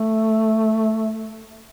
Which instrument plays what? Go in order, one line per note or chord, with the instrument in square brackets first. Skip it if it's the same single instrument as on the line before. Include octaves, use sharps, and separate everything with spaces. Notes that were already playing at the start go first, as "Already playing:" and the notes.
Already playing: [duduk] A3